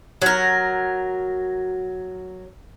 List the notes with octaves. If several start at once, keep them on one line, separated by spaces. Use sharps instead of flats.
F#3 A#4